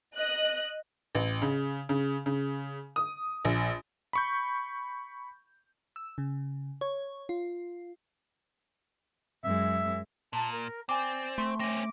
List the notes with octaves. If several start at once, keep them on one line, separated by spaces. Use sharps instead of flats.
D#5 F#6
A1
C#3
C#3
C#3
D#6
A#1
B5 C#6 G6
E6
C#3
C#5
F4
F#2 G#3 E5
A#2 A5
A#4
C4 D5 G#5 D6
A3 C6
C4 C#4 D6 A#6